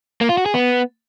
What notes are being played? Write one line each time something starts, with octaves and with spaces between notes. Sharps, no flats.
A#3
F4
F#4
G#4
B3